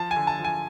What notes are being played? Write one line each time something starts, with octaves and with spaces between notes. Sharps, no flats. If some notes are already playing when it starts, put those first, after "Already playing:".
Already playing: F3 A5
G#5
D3
A5
F3
G#5